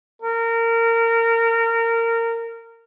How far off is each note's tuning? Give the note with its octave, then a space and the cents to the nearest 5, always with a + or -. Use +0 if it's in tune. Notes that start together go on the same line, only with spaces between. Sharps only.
A#4 -20